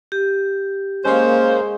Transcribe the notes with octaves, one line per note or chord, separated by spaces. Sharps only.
G4
G#3 A#3 C#4 C5